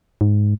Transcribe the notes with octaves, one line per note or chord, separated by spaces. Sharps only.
G#2